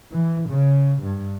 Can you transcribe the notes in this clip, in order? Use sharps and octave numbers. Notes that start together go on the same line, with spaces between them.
E3
C#3
G2